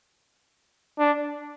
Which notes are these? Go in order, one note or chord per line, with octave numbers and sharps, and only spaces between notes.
D4